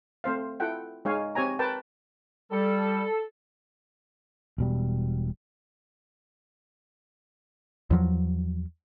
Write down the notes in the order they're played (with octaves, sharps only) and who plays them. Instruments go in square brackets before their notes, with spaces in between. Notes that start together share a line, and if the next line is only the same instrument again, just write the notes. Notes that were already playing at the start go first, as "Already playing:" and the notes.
[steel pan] A3 C4 C5 F5
E4 F4 A4 F#5 G5
G#3 D#4 C#5 F5 G#5
C4 G4 C#5 G#5 A#5
A#4 B4 G5 A5
[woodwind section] G3 [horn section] A4
[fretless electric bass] E1 B2 G3
[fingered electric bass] E2 F3 F#3